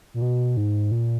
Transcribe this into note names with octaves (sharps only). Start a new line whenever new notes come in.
A#2
B2
G#2
A#2